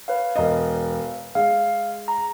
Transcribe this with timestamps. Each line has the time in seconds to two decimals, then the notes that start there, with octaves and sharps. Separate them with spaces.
0.08 B4 C#5 F5
0.36 E1 D#5
1.35 G#3 F5
2.08 A#5